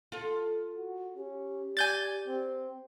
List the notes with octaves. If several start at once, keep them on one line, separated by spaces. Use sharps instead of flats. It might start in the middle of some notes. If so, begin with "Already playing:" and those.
F4 A4
F#4
C#4 G4
D5 G#5 G6 A6
C4